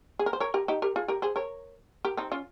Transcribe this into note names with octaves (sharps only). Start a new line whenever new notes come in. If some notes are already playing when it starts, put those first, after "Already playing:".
G#4
A#4
C5
A#4 C#5
G4 A#4
D#4 G4
G4 A#4
F4 G#4
G4 A#4
G#4 C5
A#4 C#5
G4 A#4
C4 D#4
C#4 F4